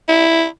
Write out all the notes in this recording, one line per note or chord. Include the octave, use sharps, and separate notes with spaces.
E4